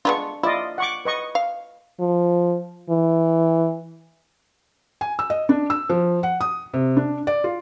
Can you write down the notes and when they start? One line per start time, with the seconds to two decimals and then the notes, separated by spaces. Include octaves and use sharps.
0.05 G#3 B3 D4 F4 C#6
0.43 E4 F4 D5 D#5
0.78 F#5 C#6 D6
1.05 B4 D#5 C#6
1.35 F5
2.00 F3
2.90 E3
5.01 G#5
5.19 E6
5.30 D#5
5.49 D4
5.70 E6
5.90 F3
6.23 F#5
6.41 D#6
6.74 C3
6.97 D4
7.27 D5
7.44 F4